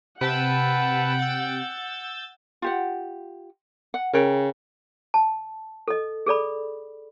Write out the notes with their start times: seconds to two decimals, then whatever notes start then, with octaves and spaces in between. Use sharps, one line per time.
0.21 C3 B4 F#5 G5 A5 E6
1.19 E6 G6 A6
2.62 F4 G4 F#5
3.94 F#5
4.13 C#3 A#4 G5
5.14 A5
5.88 A4 D#5
6.26 G#4 A4 D5 B5